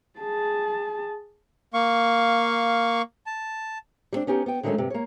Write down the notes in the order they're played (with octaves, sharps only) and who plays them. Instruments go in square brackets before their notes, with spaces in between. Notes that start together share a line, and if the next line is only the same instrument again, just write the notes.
[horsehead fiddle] G#4 A5
[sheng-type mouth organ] A#3 F5 C#6
A5
[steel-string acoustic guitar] G3 C4 D4
B3 C#4 D#4 G4
B3 G5
D3 D#3 F#3 G#3 A3 C#4
G2 C3
A#3 C#5